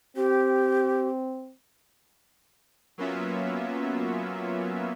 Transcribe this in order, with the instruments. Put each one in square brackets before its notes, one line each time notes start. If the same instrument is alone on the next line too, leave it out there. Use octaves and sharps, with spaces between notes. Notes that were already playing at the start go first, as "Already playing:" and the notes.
[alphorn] C4 [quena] G4
[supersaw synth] F#3 A#3 B3 C#4 F4 E5